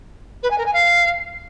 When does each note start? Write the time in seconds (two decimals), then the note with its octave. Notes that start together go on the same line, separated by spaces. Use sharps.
0.43 B4
0.51 G#5
0.58 A#4
0.66 G#5
0.74 F5